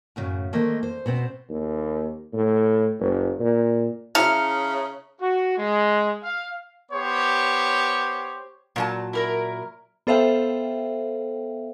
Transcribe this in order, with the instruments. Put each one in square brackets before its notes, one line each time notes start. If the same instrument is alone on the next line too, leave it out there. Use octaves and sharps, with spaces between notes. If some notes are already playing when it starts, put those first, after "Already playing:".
[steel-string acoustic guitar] F#2 A2 C#3
[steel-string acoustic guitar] D#3 A3 D#5 [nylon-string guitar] A#3 C4
[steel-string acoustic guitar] C5
[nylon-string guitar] B2 B3 C4 [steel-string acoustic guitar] C5
[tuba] D#2
A2
F#1
A#2
[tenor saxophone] C#3 [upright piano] E4 E5 [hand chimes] A5 A#5 C#7 [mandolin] F6
[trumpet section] F#4
G#3
F5
B3 G4 C5 C#5
[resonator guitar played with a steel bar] A#2 F#3 A5
[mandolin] E4 A#4 A#5
[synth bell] B3 A4 C5 E5 F5 G5